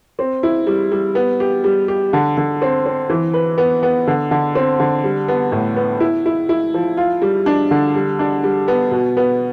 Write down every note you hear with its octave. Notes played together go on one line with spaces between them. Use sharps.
C4
E4
G3
G3
B3
G4
G3
G4
D3
D3
C4
C4
E3
B4
B3
B3
D3
D3
C4
D3
G3
B3
A2
B3
E4
E4
E4
F3
F4
G3
D4
D3
G3
D4
G3
B3
B2
B3